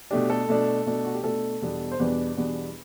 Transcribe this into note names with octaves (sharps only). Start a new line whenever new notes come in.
B2 A3 D4 G4
A4
B2 A3 D4
B2 A3 D4
F#4
G4
B2 A3 D4 A4
E2 B2 G3 B3 D4
C5
E2 B2 G3 B3 D4 B4
E2 B2 G3 B3 D4